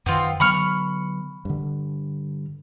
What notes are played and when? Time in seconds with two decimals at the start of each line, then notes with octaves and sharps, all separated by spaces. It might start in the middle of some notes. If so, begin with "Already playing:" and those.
0.06 F#2 D#3 B3 C4 F4
0.40 D3 F#3 B3 B5 C#6 F6
1.45 G2 D3